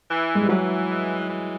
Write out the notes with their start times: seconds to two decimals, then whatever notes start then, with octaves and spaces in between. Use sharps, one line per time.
0.09 E3
0.35 G#3
0.42 G3
0.49 E3 F#3
0.89 G#3
1.30 E3